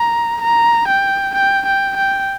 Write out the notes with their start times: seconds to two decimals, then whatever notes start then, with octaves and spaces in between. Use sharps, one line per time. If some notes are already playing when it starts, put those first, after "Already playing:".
Already playing: A#5
0.42 A#5
0.88 G5
1.35 G5
1.66 G5
1.96 G5